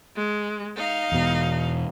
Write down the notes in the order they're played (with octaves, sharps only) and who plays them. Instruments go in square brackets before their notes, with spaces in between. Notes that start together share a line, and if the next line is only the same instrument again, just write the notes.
[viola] G#3
D#4 F5
[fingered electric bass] E2 B2